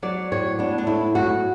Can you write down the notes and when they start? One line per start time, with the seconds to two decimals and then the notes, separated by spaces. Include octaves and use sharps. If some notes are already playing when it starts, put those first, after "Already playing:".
0.02 F#3 D5
0.32 A2 C#5
0.59 B3 D4
0.78 D4
0.87 A2 E4
1.15 F#3 F#4